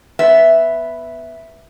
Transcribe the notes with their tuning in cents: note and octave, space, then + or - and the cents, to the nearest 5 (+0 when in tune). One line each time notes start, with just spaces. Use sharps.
B3 +0 E5 +0